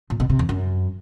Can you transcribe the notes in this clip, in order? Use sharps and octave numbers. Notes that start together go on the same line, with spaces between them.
A#2
B2
C3
E2
F#2